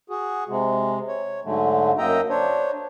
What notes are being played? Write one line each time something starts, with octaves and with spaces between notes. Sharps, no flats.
F#4 G#4
C3 G#3
C#5
G#2 D3 F#3 G#3 A3
F#2 A#3 D#5 E5 G5 A#5
D4 C5 C#5